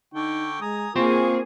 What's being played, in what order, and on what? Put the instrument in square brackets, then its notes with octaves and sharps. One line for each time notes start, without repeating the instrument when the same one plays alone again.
[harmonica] D3 G5 C#6 [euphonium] D#4
[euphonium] G#3 [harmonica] G#5 A#5 D#6
[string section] A#3 G#4 [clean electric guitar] C4 G4 C5 [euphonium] F4 [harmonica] F5 C#6